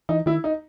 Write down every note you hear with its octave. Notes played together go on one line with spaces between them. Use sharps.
E3 D#4
D#3 E4
D#4